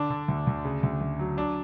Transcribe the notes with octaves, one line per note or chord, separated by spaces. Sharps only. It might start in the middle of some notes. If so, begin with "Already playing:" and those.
Already playing: D3 D4
D3
D2
D2
C#3
D2
D2
F#3
F#3 D4